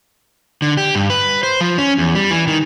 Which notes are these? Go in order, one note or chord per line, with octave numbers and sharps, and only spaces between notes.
D3
G4
G2
B4
C5
F3
C#4
E2
G3
E3
D#3